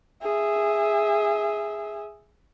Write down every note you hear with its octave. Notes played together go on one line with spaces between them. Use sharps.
G#4 E5